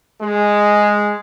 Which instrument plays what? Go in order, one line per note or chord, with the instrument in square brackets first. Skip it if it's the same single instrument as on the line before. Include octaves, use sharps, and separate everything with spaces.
[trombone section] G#3